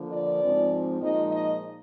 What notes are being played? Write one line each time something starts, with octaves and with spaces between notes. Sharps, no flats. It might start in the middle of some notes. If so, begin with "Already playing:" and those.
Already playing: D3 F3 A#3
D5
G#2 F3 G#3 C4
A#2 F3 G#3 D#4 D#5
D#5